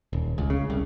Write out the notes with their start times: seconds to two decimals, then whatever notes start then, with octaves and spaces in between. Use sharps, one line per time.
0.13 D#1
0.38 C#2
0.50 C#3
0.70 C2